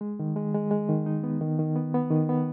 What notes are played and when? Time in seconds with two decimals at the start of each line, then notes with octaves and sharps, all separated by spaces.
0.01 G#3
0.19 D#3
0.36 G#3
0.54 G#3
0.71 G#3
0.89 D#3
1.06 D#4
1.23 B3
1.41 D#3
1.59 D#3
1.76 B3
1.94 B3
2.11 D#3
2.29 B3